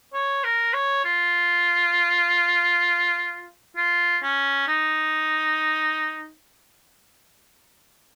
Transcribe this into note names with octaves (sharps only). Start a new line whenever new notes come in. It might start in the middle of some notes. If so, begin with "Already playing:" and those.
C#5
A#4
C#5
F4
F4
C#4
D#4